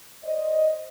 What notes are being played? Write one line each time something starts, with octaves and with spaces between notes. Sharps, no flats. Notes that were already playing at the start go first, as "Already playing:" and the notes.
C5 D5 D#5